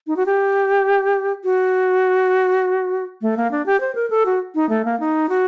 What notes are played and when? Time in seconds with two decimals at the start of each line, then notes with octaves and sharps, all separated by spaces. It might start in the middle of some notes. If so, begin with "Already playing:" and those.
0.07 D#4
0.17 F#4
0.26 G4
1.44 F#4
3.22 A3
3.37 A#3
3.51 D4
3.66 G4
3.81 C5
3.95 A#4
4.10 A4
4.26 F#4
4.55 D#4
4.69 A3
4.85 A#3
5.00 D#4
5.29 F#4